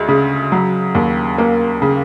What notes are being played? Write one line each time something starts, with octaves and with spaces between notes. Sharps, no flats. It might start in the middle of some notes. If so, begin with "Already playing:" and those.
Already playing: D2 G#3
C#3
F#3
D#2
A#3
C#3